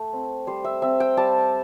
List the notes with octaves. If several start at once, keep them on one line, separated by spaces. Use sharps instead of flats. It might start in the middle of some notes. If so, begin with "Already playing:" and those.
Already playing: A3
C4
G3 C5
E5
C4 E5
G5
G3 A5